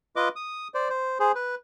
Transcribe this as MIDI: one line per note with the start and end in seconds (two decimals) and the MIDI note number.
0.16 0.29 65
0.16 0.29 71
0.16 0.29 75
0.16 0.29 86
0.36 0.68 87
0.74 0.89 72
0.74 0.89 74
0.90 1.19 72
1.20 1.32 68
1.20 1.32 72
1.35 1.55 71